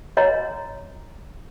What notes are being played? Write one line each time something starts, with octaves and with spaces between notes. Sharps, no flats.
F#4 C#5 D#5 A#5